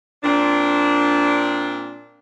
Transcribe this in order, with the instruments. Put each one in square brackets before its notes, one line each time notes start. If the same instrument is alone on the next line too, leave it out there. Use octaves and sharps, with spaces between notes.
[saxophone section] A#2 C4 D4